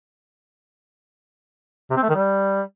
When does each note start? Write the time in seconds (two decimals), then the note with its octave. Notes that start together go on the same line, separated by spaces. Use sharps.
1.90 C3
1.97 C4
2.03 A3
2.09 D#3
2.15 G3